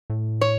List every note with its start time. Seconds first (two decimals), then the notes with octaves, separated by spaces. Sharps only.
0.10 A2
0.41 C#5